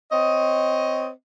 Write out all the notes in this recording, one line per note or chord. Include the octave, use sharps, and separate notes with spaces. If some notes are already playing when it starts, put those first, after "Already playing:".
C4 C#5 D#5